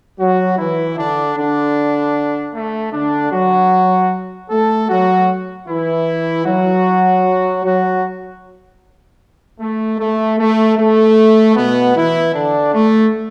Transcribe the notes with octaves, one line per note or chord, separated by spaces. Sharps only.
F#3 F#4
E3 E4
D3 D4
D3 D4
A3
D3 D4
F#3 F#4
A3 A4
F#3 F#4
E3 E4
F#3 F#4
F#3 F#4
A3
A3
A3
A3
B2 B3
E3 E4
D3 D4
A3